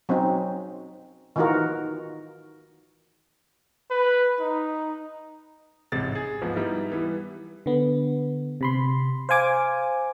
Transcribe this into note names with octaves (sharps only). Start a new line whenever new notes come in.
F#3 C4 C#4 D#4
D#3 E3 D#4 F4 F#4 A#4
B4
D#4
A1 G#2 C3 A6
G#4
G#2 F3 B3
G3 B3 D#4 E4
E3 G3 B3
D3 B3
C3 B5 C6
C5 F5 G#5 D6